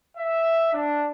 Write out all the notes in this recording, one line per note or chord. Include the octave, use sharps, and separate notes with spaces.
E5
D4